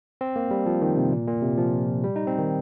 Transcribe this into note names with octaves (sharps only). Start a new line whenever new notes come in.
C4
A#3
G3
F3
D#3
C3
A#2
A#2
C3
F3
G3
D#4
C4
D#3